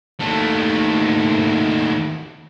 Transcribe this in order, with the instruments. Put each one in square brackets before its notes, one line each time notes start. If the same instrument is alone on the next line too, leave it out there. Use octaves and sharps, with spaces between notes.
[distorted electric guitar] D#2 A3